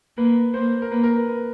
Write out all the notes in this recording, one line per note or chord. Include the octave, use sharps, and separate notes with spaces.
A#3 B4
A#3 C5
A#4
A#3 B4
A#4
B4
B4